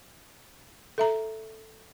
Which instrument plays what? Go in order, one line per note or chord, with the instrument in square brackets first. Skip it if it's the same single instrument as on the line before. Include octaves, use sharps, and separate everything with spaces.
[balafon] A4 E5 A#5